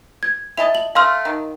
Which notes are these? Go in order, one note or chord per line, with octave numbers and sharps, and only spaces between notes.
G#6
E4 D#5 A5 F7
F#7
A3 A4 F5 C6 F6
D#3